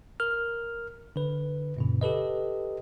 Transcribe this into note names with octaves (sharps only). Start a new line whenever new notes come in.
A#4 F6
D3 B4
F#2 A#2 C#3
G4 A4 B4 D#5